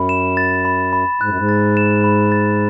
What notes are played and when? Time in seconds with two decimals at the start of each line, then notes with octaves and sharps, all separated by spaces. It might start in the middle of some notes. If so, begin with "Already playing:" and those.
Already playing: F#2 B5
0.09 E7
0.37 A6
0.65 B5
0.93 B5
1.21 G#2 F#6
1.29 F#2
1.37 G#2
1.49 A6
1.77 E7
2.04 B5
2.32 A6